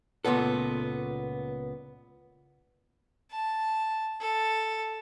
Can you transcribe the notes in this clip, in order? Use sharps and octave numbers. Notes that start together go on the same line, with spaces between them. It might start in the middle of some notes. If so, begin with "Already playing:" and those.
C#2 A#2 A3 B3 A4
A5
A4